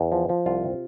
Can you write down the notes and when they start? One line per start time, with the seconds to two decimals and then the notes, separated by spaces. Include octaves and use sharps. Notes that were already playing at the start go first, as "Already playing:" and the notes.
Already playing: E2
0.12 F3
0.29 F3
0.46 C2 F4
0.64 C3